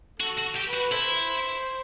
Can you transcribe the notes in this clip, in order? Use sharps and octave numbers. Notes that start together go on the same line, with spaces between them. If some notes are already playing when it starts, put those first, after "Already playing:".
F#4 A4
F#4
G4
B4
F#4
E4 A4 C5